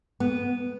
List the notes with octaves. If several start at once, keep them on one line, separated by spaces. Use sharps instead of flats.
B3